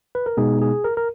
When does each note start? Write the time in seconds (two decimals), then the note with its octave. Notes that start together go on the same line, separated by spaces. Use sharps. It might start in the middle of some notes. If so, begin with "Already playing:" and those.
0.15 B4
0.26 A#4
0.37 B2 G#3 B3 D#4 G#4
0.62 G#4
0.84 A#4
0.97 A#4